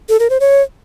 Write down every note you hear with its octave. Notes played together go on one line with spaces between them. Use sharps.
A4
A#4
C5
C#5